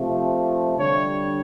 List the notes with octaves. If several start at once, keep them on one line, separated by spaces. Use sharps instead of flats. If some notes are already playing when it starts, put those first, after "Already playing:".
Already playing: C3 F3 A3
D3 G3 C#5